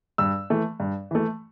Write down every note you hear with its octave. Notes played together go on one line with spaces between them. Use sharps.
G2 E6
E3 A3
G2
E3 A3